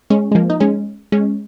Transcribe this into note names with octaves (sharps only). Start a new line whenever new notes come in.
G#3 C#4
G#3
F3 A#3
D#4
G#3 C#4
G#3 C#4